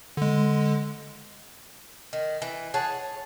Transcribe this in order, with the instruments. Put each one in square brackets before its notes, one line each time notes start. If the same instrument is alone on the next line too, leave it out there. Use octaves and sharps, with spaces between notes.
[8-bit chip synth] D3 G#3
[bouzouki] D#3
E3
G#4 C#5 F#5 A5